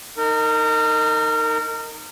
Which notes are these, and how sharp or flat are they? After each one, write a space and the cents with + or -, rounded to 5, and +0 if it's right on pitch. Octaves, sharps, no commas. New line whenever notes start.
D#4 +0 A#4 -30